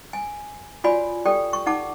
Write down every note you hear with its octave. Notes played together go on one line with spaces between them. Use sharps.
G#5
F4 F#4 C#5 D5 G#5 B5
G4 A4 D5 G5
C#6
D#4 F#5 A5 D6